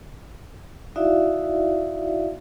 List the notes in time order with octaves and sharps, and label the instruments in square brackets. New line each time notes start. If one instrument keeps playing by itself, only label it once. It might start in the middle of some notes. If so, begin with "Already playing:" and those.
[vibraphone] D#4 E4 F#4 D5 E5 F5